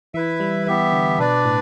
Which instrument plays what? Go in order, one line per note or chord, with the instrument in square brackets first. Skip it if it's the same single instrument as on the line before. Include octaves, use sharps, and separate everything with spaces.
[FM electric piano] E3 [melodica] E4 B4 E5
[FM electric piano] G3
[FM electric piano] E3 [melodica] B3 G4 E5
[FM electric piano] D3
[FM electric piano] B2 [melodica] D4 B4 D5
[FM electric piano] A2